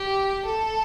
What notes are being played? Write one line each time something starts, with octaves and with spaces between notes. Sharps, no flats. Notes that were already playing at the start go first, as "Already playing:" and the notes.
Already playing: G4
A4